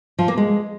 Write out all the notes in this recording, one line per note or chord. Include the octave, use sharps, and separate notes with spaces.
F3
A#3
G#3